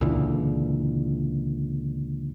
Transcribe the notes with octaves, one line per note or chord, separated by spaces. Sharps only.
C#2 A#2 D3 E3